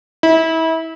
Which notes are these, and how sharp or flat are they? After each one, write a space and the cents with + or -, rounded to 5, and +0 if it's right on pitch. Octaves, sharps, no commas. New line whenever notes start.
E4 -30